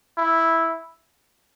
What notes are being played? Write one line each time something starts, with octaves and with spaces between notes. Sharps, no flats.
E4